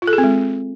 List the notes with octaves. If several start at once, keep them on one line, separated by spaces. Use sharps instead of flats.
F4
A4
G#4
C4
G#3